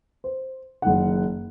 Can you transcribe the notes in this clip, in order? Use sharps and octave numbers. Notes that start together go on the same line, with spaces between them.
C5
F#1 D#3 F#5